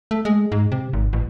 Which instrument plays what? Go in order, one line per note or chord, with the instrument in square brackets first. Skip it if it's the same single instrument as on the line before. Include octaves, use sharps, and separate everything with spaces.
[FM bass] A3
G#3
G#2
C3
G#1
A1